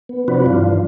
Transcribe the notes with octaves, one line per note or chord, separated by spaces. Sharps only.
B3
C3 F3 C4 D4 F#4 B4
G2 E3 D4 F4